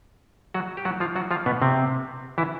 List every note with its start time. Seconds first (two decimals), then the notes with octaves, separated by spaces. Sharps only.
0.54 F#3 F#4
0.77 G4
0.85 F#3 F#4
1.00 F3 F4
1.16 F#3 F#4
1.31 F3 F4
1.46 B2 B3
1.62 C3 C4
2.38 E3 E4